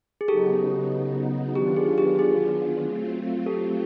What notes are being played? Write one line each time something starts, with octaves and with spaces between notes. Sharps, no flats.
G#4
C#3 F#3 B3 D#4 G4 A4
D#3 F#3 B3 D4 F4 G4
G#4
G4
G#4
F#3 A3 C4 F4
G4 A4